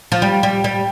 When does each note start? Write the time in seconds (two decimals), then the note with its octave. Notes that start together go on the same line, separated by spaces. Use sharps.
0.12 F3
0.22 G3
0.43 G3
0.64 G3